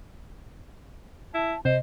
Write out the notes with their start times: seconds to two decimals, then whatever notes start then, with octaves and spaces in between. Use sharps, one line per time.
1.34 E4 A5
1.65 C3 C5 D#5